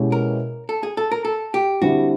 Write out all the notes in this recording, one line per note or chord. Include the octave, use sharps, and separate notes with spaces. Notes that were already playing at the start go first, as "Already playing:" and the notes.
Already playing: B2 G#3 C#4 E4 G4
A#4
A4
G#4
A4
A#4
A4
G4
D3 G3 C4 E4 F#4